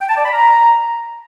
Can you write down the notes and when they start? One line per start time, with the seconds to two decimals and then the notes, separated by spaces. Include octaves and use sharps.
0.01 G5
0.09 A5
0.17 D5
0.24 B5
0.32 A#5